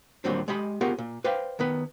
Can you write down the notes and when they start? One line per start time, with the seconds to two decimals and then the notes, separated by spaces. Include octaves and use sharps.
0.24 D#2 A#2 F#3 G3 C4 D4
0.48 G#3 G4 D#5 B5
0.81 B3 F4 G4 G#4 A#4 C#5
0.98 A#2
1.24 B4 C5 D5 F5 G5
1.59 D#3 B3 B4